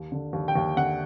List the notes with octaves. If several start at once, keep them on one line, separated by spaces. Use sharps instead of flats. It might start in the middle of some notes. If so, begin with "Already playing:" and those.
Already playing: D#2
D3
D#2
G5
D#2
D3 F#5